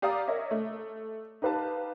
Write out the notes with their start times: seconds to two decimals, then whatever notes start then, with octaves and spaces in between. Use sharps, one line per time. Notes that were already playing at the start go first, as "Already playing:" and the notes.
0.02 G4 D5 F5 A#5 D6 D#6
0.28 A#4 C#5 D#5 E5
0.51 A3
1.42 D#4 G4 B4 F5 A5